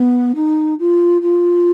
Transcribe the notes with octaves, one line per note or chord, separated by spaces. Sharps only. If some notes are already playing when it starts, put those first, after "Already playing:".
Already playing: B3
D#4
F4
F4